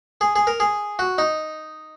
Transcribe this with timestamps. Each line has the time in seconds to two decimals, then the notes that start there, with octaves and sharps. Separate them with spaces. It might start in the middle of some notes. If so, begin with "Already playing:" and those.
0.21 G#4
0.36 G#4
0.47 A#4
0.60 G#4
0.99 F#4
1.18 D#4